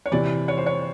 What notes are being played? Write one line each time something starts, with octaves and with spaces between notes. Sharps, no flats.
C#5
C3 E3 D5
C#5
C5
C#5